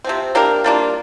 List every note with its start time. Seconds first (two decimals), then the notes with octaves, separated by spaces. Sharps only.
0.04 C3 F3 C4
0.35 A#3 D4 G4 A#4
0.64 G3 A#3 D4 F4